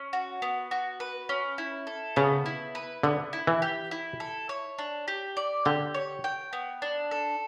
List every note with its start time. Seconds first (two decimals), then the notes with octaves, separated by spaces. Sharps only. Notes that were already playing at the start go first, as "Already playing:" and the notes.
Already playing: C#4
0.13 F#4
0.42 B3
0.71 F#4
1.00 B4
1.29 C#4
1.58 E4
1.87 A4
2.16 C#3 B3
2.46 E4
2.75 B4
3.03 D3 B3
3.33 E4
3.47 E3
3.62 G4
3.91 E4
4.20 A4
4.49 C#5
4.78 D4
5.08 G4
5.37 D5
5.65 D3 G4
5.94 C#5
6.24 G5
6.53 B3
6.82 D4
7.11 A4